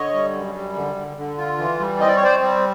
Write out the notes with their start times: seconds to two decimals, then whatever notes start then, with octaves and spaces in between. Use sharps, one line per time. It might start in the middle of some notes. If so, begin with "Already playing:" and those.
Already playing: D3 C#5 D#5
0.14 G3
0.34 F#2
0.55 G3
0.76 D3
0.96 D3
1.17 D3
1.38 F4
1.58 E3
1.80 G3
2.00 C4 D#5
2.08 D5
2.16 C#5
2.21 C4 C5 D5
2.42 G3